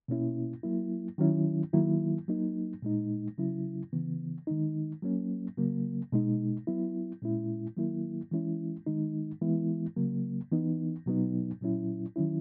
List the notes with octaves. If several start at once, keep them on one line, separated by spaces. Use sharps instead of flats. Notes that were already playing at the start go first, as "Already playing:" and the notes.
B2 A#3 C#4 E4
F#3 A#3 E4
D#3 F#3 C#4 E4
D#3 F#3 A#3 E4
F#3 A#3 D#4
A#2 G#3 D#4
C#3 F#3 C#4 E4
C#3 E3 B3
D#3 G#3 D#4
F#3 A#3 C#4
C#3 F#3 A#3
B2 G#3 D#4
F#3 B3 E4
A#2 G#3 C#4 E4
D#3 F#3 A#3 E4
E3 G#3 C#4 E4
D#3 G#3 D#4
E3 G#3 B3 E4
C#3 F#3 A#3
E3 B3 D#4
B2 F#3 B3 D#4
A#2 F#3 C#4 E4
D#3 F#3 C#4 E4